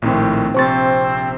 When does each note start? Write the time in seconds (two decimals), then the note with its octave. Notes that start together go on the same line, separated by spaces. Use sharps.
0.02 A#1 A2 D#3 C4
0.54 A#1 C3 C4 C5 C#6 A6